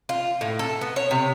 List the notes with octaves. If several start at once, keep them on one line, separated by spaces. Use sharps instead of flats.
F4
A2
A4
B3
C#5
C3